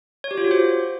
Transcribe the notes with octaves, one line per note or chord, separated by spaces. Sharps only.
C#5
G4
F4
F#4
C5